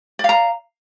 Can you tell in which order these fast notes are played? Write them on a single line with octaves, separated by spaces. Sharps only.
D5 F5 A#5